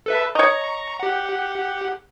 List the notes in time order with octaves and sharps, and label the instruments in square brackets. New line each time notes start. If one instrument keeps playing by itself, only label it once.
[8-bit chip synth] A4 B4 E5
[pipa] C#5 D#5 [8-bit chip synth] A#5 C#6
[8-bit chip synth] G4 F#5